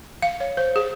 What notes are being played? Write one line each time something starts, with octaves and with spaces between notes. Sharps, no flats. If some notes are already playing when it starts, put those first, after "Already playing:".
F5
C#5
C5
G#4